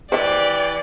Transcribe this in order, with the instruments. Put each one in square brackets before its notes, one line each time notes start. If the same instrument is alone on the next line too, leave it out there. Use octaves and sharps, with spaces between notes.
[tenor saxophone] E3 [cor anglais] G4 [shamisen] C5 E5 [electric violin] D5